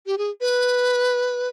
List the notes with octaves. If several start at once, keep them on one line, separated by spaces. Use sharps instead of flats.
G4
G#4
B4